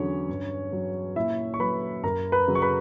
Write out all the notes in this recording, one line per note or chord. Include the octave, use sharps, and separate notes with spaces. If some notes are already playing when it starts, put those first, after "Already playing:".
Already playing: E2 D3 F#3 C#4 C#5
G2
F#3
A#2 E4 E5
C#6
F#3 B4 B5
F#2 A#4 A#5
B4 B5
C#3 F#3
C#6
B4 B5